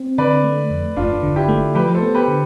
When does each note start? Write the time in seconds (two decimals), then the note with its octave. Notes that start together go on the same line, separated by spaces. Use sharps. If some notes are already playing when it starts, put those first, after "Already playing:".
Already playing: C4
0.18 D3 B4 D5
0.44 A3
0.70 F2
0.96 G1 D4 F4
1.23 D3
1.36 E4 G4
1.49 A3
1.75 F3 G4 B4
1.95 A4 C5
2.02 B3
2.15 G4 B4
2.28 D3